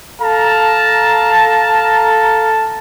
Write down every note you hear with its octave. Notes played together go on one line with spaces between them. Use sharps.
A4 F5 A5 A#5